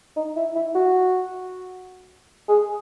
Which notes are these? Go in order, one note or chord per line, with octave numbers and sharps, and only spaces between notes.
D#4
E4
E4
F#4
G#4